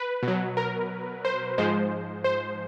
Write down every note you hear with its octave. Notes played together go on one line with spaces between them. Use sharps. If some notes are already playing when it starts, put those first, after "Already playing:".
Already playing: B4
B2
F#3
A#4
C5
G#2 F3 G#3 C5
C5